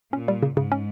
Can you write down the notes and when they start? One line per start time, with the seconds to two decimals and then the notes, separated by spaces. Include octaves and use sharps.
0.13 A#2 C#4
0.28 G3
0.43 C#3
0.56 G#2 C#3
0.72 C#4